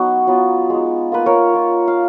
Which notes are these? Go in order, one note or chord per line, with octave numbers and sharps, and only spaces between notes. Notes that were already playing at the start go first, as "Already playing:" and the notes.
Already playing: F#3 B3 C#4 D#4 F#4
F#3 B3 F4
G#3 D#4
A#3 F4 B4
A#4 C#5
A#3 F4
F5